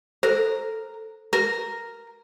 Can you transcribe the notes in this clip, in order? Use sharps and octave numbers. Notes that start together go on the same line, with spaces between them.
A4 A#4 C5
A#4